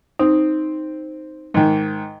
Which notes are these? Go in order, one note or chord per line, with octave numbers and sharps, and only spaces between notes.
C4 D#4
G#2 D#3